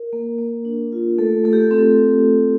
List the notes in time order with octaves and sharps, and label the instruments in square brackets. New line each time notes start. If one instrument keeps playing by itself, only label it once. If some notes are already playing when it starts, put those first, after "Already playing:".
Already playing: [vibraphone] A#4
A#3
A#3
D4
F4
A3 A4
A3 A4
G4
A4
C4 A4